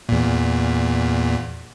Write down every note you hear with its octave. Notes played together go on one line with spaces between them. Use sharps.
E2 A#2